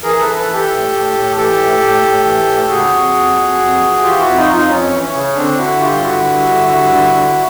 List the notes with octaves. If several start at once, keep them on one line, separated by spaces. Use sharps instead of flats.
E3 G#4 A#4
E3 A4 B4
A4 B4
E3
G4 A4
A2
A2
A2
E3 G4 A4
A2
A2
A2
E3
A2
C#3 F#4 G#4
F2
F2
F2
F2
E3
E3 F4 G4
E4 F#4
F2
D#4 F4
F2
D#4 F4
F2 C#4
E3
C#4
C#3
D3 C4 D4
D3 E4 F#4
G2 F4 G4
D3 E4 F#4
G2
D3
G2
D3
D3